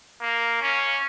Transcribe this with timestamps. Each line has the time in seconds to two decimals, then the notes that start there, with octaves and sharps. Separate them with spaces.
0.21 A#3
0.61 C#4